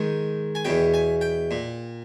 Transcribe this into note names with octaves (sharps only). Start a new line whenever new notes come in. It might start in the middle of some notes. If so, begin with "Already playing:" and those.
Already playing: G#2 D#3
G#5
E2 B2 G5
G#5
G5
A#2